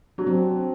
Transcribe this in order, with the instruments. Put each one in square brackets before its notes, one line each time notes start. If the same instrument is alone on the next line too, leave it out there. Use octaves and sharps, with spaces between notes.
[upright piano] F#3 [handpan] D4
[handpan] C4